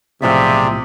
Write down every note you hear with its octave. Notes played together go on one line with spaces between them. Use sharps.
B1 A2 C3 F3 G#4 C5 D5 E5